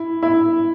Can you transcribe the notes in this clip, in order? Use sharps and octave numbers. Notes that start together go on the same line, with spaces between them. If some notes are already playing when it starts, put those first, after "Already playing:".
Already playing: E4
E4